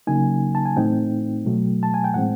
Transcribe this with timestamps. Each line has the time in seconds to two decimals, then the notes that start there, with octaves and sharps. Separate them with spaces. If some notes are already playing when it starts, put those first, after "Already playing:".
0.07 C#3 F#3 A#3 D#4 G#5
0.55 A5
0.65 G#5
0.76 A2 E3 A3 C4 D#4 G5
1.45 B2 F#3 A3
1.83 A5
1.94 G#5
2.04 G5
2.14 A2 E3 G#3 C4 F#5